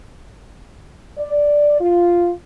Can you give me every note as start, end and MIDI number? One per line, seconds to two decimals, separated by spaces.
1.18 1.77 74
1.80 2.30 65